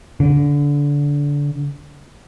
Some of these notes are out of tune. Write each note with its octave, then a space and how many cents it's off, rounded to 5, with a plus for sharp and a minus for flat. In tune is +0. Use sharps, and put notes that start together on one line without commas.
D3 -25